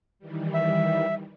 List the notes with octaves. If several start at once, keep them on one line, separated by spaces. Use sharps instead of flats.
D#3 E3 G3
E5